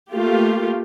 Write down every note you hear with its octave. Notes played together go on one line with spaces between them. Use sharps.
A3 A#3 F4 G4